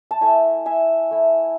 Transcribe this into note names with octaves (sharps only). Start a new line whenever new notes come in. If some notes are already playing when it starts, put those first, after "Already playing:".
A5
A3 E4 E5 G#5
E5 G#5
A3 E4